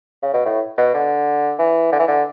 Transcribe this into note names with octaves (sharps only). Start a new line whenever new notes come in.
C#3
B2
A2
B2
D3
E3
D3
E3
D3